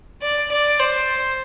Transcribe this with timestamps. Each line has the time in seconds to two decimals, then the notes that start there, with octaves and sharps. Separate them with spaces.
0.22 D5
0.51 D5
0.79 C5